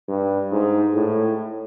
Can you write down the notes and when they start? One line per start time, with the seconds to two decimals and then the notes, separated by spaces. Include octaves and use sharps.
0.08 G2
0.52 G#2
0.95 A2